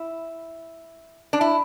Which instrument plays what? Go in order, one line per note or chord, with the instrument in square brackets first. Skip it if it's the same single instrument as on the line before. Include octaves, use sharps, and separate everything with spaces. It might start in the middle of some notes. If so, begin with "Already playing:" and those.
Already playing: [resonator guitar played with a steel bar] E4
D4
E4